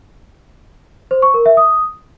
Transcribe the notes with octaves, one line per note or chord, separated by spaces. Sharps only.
C5
C#6
A#4
E5
D#6